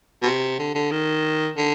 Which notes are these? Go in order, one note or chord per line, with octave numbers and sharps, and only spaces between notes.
B2
C3
D3
D3
D#3
D3